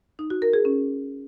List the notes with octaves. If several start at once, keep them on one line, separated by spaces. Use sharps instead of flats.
D#4
F#4
A#4
G#4
C#4